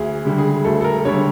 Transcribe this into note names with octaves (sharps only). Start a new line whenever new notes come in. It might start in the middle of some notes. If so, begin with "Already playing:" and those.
Already playing: D2 G#4
D3 G3
G#4
D2 A4
A4
A#4
D3 G3 C#5